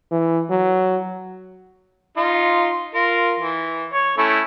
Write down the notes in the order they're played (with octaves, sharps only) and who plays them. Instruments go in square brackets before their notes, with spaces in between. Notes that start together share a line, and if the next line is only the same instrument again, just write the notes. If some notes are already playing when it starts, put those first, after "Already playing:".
[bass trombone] E3
F#3
[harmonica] D#4 F4
F4 A#4
E3
C#5
A3 C#4 E4